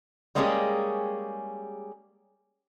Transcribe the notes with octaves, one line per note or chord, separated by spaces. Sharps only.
G3 G#3 A#3 C#4 G4 G#4